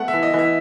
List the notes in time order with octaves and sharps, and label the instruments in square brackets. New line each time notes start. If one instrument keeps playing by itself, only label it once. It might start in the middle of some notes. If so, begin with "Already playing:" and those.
Already playing: [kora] A3 B3 [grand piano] F#5
[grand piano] E5
[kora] E3
[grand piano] D#5
[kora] E3
[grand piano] E5